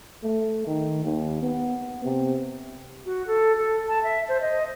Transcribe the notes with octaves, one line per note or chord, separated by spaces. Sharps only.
A3
D#3
D#2
B3
C3
F#4
A4
A4
A5
E5
C5
D#5